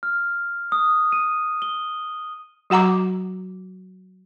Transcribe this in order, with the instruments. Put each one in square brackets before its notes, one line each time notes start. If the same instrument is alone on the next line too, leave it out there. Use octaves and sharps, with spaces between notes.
[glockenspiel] F6
D#6
D#7
G7
[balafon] F#3 F#4 F#5 A#5 D6